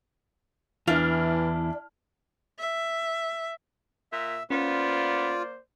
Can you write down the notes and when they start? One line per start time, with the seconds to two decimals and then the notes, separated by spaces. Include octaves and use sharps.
0.88 E2 E3 D4 E4 F6 F7
2.59 E5
4.12 A#2 E5
4.50 A#3 B3 C#4 F4 C5 D5